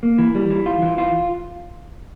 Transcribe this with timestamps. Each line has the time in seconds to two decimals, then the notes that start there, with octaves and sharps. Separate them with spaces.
0.03 A#3
0.18 E3
0.35 G3
0.50 E3
0.66 F4
0.82 E3
0.98 F4